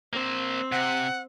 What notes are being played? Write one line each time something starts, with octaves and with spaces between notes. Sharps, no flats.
A#3 C4 C5
C3 F#5